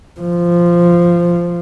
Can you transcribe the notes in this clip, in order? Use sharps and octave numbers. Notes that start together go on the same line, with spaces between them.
F3